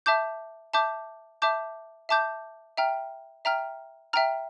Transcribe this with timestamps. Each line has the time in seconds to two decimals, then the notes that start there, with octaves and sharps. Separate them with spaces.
0.06 E5 A5 D6 G6
0.74 E5 A5 D6 G6
1.42 E5 A5 D6 G6
2.09 E5 A5 D6 G6
2.77 E5 G5 A#5 F6
3.45 E5 G5 A#5 F6
4.13 E5 G5 A#5 F6